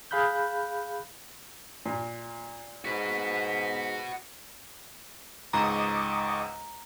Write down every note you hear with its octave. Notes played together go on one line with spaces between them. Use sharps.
G#4 F5 B5 F#6 G6
A#2
G#2 F#4 B4 B6
C#2 G#2 D#5 A#5 C#6 D6